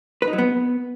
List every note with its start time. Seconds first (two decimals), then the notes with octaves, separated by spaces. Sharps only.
0.22 B4
0.28 D#4
0.33 F#3
0.38 B3